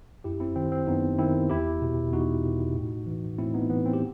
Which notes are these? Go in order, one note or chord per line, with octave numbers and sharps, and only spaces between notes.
F#2 E4 G4
C4 E4
D#3 C4
C4
F#2 B3 D#4
D#3 C4 E4
E2 E4 G4
B2
E2 D#4 F#4
B2
A2
E3
A2 C4 E4
B3 D#4
E3 B3
C4
G4